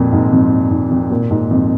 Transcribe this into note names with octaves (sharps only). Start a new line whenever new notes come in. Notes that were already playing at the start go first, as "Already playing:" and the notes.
Already playing: F2 A#2
G#2
F2
G#2
F2
A#2
G#2
F2